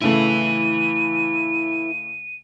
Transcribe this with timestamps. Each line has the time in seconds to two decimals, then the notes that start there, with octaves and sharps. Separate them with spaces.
0.02 A2 C#3 A3 E4 B4 D#7